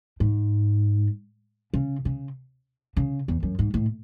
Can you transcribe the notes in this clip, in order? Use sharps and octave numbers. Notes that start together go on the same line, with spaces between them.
G#2
C#3
C#3
C#3
E2
F#2
G#2
A2